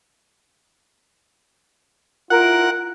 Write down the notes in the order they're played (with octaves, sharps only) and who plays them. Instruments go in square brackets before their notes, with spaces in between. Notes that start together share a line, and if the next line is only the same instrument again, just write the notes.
[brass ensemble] E4 F4 [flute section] A#4 [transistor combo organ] F#5